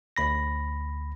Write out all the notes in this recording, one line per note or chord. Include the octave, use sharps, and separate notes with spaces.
D2 B5 A#6